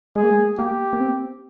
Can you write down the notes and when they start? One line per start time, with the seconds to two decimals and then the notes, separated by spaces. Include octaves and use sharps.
0.16 G#3 G#4
0.23 A#3
0.30 G#3
0.58 A#3 G4
0.93 A#3
1.00 C4